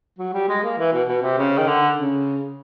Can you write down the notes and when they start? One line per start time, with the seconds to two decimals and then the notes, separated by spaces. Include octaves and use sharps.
0.19 F#3
0.34 G3
0.49 G#3
0.64 A#3
0.78 E3
0.93 B2
1.08 B2
1.23 C3
1.38 C#3
1.58 D#3
1.68 D3
1.97 C#3